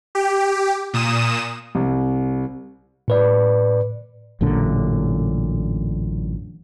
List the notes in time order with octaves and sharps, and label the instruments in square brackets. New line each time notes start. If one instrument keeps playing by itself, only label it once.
[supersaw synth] G4
A#2 D#6 E7
[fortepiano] C2
[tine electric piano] A2 B4 D5
[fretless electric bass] A1 F#2 A#2 D3